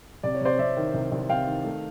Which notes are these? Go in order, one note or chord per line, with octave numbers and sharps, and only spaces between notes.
C3 D5
C#5
C3 C5 D5
C3 D5 E5
D#3
C2
C2
C3 F5 G5
D#3
A3